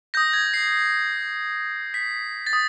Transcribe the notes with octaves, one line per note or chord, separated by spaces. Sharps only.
D#6 G6 A#6
G#6
C7
B6
A6
D#6